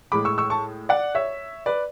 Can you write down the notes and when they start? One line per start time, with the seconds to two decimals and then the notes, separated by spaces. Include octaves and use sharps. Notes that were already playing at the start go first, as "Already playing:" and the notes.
0.12 A2 G#3 B5 D6
0.25 C#6 E6
0.38 C#6 E6
0.50 A5 C#6
0.89 D5 F#5
1.15 C#5 E5
1.66 B4 D5